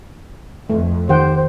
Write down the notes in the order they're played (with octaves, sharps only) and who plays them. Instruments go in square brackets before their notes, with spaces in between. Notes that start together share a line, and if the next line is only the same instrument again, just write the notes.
[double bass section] F2 [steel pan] A3
[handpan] D#3 [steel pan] G4 F#5 G5 [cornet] C5